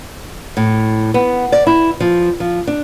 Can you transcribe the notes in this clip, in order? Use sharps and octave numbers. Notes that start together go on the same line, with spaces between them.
A2
B3
D5
E4
F3
F3
D4